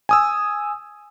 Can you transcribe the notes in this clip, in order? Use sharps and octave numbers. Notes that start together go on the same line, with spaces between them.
G#5 D#6 E6